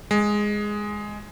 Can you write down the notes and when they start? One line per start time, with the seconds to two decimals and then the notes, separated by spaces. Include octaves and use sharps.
0.11 G#3